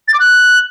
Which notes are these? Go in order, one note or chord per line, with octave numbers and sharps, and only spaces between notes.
A6
D6
F#6